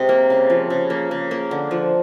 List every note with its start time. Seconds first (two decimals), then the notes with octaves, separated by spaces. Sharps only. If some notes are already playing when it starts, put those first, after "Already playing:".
Already playing: C3 G#3
0.09 A#3
0.30 C#3
0.50 F3
0.70 C#3
0.90 A#3
1.11 C#3
1.31 A#3
1.51 D3
1.71 F3